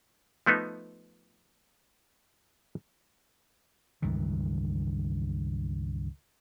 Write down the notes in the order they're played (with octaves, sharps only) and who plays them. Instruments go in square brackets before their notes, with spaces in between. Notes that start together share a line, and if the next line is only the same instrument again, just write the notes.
[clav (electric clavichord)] F3 A3 B3 D#4
[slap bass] C#2 G2 D#3 E3